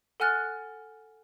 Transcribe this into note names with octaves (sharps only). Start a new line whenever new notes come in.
A4 F#5 G#5 F6 F#6 A6